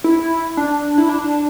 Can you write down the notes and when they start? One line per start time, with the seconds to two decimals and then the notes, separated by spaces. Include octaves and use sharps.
0.04 E4
0.57 D4
0.98 E4
1.09 D4